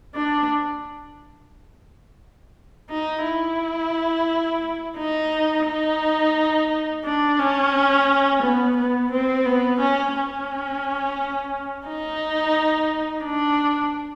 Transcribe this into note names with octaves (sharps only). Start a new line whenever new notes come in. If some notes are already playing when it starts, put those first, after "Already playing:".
D4
D#4
E4
D#4
D#4
D4
C#4
B3
B3
C4
B3
C#4
C#4
D#4
D4